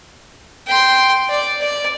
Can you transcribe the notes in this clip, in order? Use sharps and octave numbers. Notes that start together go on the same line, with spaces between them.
G5 C6
D5
D5